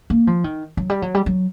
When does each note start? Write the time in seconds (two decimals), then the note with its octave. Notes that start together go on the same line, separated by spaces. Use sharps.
0.10 A#3
0.27 F3
0.44 D#3
0.77 F#3
0.90 G3
1.02 F#3
1.15 G3
1.26 F#3